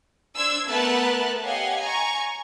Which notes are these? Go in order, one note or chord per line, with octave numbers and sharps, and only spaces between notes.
D4 C5 E6 G#6
A3 B3 A#4 A5 F#6
G4 C#5 D#5 F5 F#5 G#5
G#5 A#5 C#6